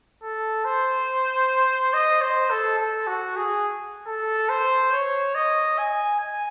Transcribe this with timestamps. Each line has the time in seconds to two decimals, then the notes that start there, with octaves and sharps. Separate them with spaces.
0.23 A4
0.65 C5
1.93 D#5
2.21 C5
2.50 A4
2.79 A4
3.07 F#4
3.36 G#4
4.07 A4
4.49 C5
4.92 C#5
5.35 D#5
5.78 G#5
6.20 G#5